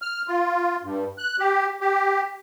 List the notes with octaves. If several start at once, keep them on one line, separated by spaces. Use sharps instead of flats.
F6
F4
G2
F#6
G4
G4